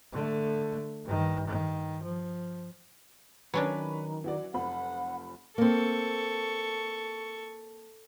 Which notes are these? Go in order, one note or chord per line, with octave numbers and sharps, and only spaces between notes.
D3 A3
G2 D#3
D#3
F3
D#3 F#3 C#4 D4 B4 C#5
E3 F#4 D5
F1 F3 F#5 B5
A#3 C4 A4 C#6